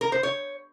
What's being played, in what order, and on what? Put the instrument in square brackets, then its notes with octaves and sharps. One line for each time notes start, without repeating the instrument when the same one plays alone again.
[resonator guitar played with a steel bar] A#4
C5
C#5